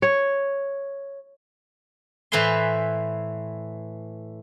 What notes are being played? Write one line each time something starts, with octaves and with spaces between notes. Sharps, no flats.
C#5
A2 E3 B4 C5 G#5 C6